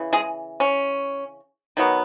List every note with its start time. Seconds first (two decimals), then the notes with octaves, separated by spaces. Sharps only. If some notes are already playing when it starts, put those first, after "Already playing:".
Already playing: C#3 E3
0.13 G#3 G#4
0.60 C#4
1.77 D#3 F#3 B3